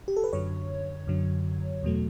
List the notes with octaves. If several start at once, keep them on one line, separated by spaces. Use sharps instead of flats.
G4
A4
B4
F#2 D3 F#3 C#5
F#2 D3 F#3
E2 B2 F#3 A3